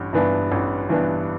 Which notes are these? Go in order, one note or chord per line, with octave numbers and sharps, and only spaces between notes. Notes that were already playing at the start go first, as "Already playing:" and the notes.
Already playing: A1 G2
G2 E3 B3 D4
A1
G2 E3 B3 D4